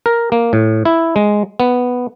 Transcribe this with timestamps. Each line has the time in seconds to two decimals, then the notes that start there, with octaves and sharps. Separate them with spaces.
0.06 A#4
0.32 A#3
0.53 A2
0.85 E4
1.16 G#3
1.60 B3